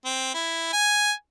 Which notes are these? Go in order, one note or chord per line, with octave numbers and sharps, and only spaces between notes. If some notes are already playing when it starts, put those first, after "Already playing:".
C4
E4
G#5